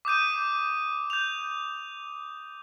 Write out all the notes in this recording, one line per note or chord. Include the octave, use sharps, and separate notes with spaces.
D6 D#6 G6 D#7
G6 F7